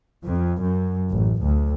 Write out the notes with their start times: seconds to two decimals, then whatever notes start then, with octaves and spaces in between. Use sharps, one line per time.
0.25 F2
0.62 F#2
1.12 A1
1.42 D2